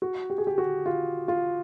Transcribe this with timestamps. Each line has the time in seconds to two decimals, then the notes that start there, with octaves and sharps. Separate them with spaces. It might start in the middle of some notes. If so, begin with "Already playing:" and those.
0.02 F#4
0.30 G4
0.38 G#4
0.47 G4
0.58 F#4
0.86 F4
1.28 F4